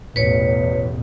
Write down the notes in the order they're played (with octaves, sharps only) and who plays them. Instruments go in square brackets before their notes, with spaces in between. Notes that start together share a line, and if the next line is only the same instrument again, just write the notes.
[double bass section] A1 E2 B2 [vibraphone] B4 C#5